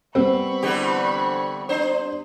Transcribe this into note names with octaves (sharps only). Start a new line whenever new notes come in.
G3 B3 C4 B5 C#6
D3 E3 G4
D4 C5